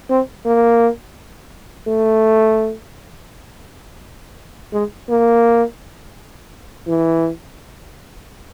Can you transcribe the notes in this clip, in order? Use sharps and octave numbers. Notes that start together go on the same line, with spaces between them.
C4
A#3
A3
G#3
A#3
E3